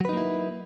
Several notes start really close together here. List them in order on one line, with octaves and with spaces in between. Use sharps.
F#3 B4 D#4 A#3 E4